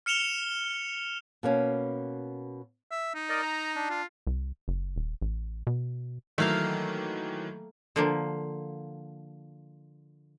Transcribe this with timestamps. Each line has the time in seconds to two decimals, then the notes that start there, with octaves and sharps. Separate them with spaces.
0.06 F6 C#7 E7 F7 G7
1.43 B2 A#3 C#4
2.91 E5
3.14 D#4
3.30 A#4 D5 D#5
3.43 A#5
3.76 D4
3.90 F4
4.27 C2
4.68 F#1
4.96 D#1
5.21 A1
5.67 B2
6.38 D#3 E3 F#3 A3 A#3 F5
7.96 D3 F3 A#3